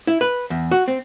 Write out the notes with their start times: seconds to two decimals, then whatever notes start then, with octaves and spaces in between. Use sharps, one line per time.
0.07 E4
0.21 B4
0.50 E2
0.71 F#4
0.88 C4